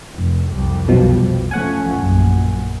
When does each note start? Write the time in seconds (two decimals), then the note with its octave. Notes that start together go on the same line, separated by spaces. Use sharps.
0.12 F1
0.50 C2 F2 G3
0.88 B1 B2 F3
1.51 F3 A3 C#4 F#5 G#5
1.92 A#1 F#2